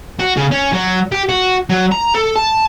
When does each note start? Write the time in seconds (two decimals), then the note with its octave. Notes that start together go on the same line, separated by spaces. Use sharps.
0.20 F#4
0.37 C#3
0.51 C#4
0.72 F#3
1.12 G4
1.29 F#4
1.70 F#3
1.92 A#5
2.15 A4
2.36 A5